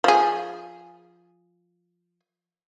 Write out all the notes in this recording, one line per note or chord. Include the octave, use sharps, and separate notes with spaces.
F3 G#4